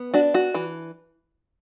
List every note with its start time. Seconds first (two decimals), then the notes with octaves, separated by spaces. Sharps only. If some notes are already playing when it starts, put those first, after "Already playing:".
Already playing: B3
0.14 D4 F#4
0.34 F#4
0.54 E3